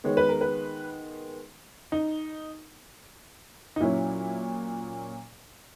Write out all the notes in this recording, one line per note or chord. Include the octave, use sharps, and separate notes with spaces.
D#3 G#3 B3 C#5
B4
A#4
B4
D#4
D#4
A#2 F#3 C#4 E4